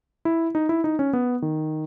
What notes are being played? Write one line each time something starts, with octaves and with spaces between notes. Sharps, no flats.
E4
D#4
E4
D#4
C#4
B3
D#3